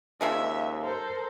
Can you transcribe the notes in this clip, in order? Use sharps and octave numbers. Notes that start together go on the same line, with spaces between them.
D#2 C#3 F3 G#3 E5
A4 A#4 C5